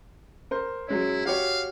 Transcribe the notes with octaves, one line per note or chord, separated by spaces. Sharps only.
A#4 C5
F#3 G#3 C#4 E4
F#4 G4 C#5 F5